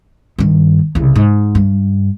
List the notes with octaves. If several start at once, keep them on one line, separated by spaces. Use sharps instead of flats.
G2 D#3
C2 C#3
G#2
G2